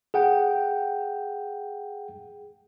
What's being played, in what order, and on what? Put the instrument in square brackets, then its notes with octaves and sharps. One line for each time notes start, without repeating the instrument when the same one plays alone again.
[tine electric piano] G#4 F#5 G5